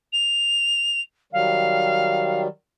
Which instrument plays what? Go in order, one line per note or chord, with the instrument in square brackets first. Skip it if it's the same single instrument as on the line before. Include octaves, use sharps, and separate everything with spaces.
[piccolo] F7
[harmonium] D#3 F#3 G3 [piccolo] F5